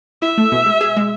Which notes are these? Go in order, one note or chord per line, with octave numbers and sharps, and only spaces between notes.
E4 E5
A3
B2
G#3
G#4
G#3